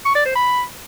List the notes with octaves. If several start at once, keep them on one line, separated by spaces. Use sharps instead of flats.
C#6
D5
C5
B5